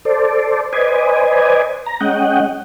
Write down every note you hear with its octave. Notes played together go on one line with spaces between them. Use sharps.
A4 C5 D5
B4 C5 D5 D#5 G#5
A#5
G#3 C#4 D#5 F#5 G5